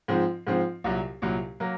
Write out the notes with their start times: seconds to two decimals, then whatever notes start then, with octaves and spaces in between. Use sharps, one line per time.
0.08 G#2 F3 C4
0.47 G#2 F3 C4
0.84 C2 A#2 F#3
1.22 C2 A#2 F#3
1.60 F#3 A#3